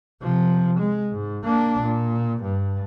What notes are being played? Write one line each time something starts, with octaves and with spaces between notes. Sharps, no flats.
C3 F3
G#3
G#2
A#3 D4
A#2
G2